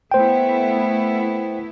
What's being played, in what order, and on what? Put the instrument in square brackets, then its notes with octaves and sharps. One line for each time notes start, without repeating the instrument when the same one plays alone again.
[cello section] A3 B3 E4 [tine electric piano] C5 G5